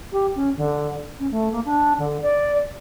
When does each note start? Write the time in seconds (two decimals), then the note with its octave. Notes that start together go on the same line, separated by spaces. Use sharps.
0.12 G4
0.35 C#4
0.57 D3
1.19 C#4
1.31 A3
1.52 A#3
1.65 D4
1.98 D3
2.22 D5